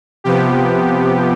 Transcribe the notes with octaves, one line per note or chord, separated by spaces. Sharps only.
C3 F3 B3 G4